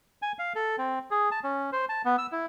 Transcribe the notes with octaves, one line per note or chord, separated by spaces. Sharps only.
G#5
F5
A4
C4
G#4
A5
C#4
C5
A5
B3
E6
E4